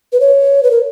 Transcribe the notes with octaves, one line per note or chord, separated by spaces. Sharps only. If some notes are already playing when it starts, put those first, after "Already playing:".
B4
C#5
B4
A#4